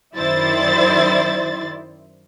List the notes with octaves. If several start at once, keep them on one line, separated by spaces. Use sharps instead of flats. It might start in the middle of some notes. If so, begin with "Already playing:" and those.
F#2 D#3 E4 C5 D5 A6